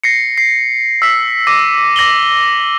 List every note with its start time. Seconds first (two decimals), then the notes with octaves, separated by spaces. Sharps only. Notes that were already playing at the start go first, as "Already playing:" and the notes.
0.04 A#6 C7 C#7
0.38 C7
1.02 E6 B6
1.47 D6 A#6 D#7
1.96 D6 A#6 F#7 G7